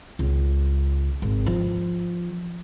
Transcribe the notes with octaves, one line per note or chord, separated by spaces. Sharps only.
C#2
G#1
F3